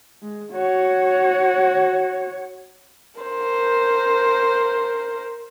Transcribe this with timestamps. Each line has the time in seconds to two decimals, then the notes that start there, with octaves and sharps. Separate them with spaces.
0.22 G#3
0.53 F#4 C#5
3.21 A#4 C5